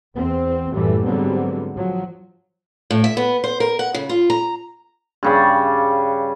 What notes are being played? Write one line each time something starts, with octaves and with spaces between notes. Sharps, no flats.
E2 C4
F#2 A2 E3 G3 A3
G#2 D3 F#3 G3 B3 C4
F3 F#3
A2
E5
B3
C5
A#4
F#5
C#3
F4
A#5
G2 C#3 G3